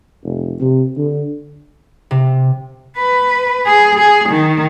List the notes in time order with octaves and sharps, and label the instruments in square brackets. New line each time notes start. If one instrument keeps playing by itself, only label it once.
[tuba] F1
C3
D3
[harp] C3
[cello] B4
G#4
G#4
D#3